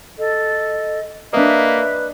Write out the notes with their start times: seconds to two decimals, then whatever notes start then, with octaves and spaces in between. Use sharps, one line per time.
0.18 A4 D#5
1.33 A#3 D4 B4 D#5 E5